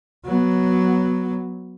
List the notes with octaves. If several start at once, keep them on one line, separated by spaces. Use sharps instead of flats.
F#3 B3